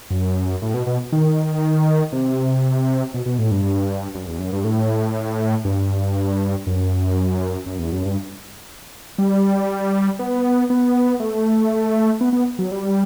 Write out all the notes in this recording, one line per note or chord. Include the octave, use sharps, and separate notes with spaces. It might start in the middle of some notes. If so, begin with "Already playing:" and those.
F#2
A2
B2
B2
D#3
C3
B2
B2
A2
G2
F#2
E2
F#2
G2
A2
G2
F#2
F#2
E2
F#2
G2
G3
B3
B3
A3
B3
B3
F#3
G3